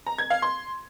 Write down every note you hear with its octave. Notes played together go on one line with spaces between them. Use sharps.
A#5
G#6
F5
C6